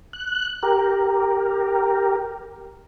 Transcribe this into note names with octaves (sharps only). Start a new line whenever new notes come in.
F#6
G4 A#4